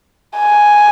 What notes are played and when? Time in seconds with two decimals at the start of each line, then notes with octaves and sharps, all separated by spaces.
0.38 G#5